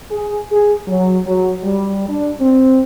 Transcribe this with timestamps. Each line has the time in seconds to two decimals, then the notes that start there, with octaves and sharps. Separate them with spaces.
0.11 G#4
0.51 G#4
0.87 F#3
1.26 F#3
1.63 G3
2.08 D4
2.40 C4